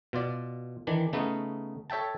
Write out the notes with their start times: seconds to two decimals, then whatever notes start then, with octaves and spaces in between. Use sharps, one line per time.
0.13 B2 F4 D5
0.87 D#3 E3 D4
1.13 C#3 A3 B3 C#4 D#4
1.90 A4 C#5 E5 G5 A5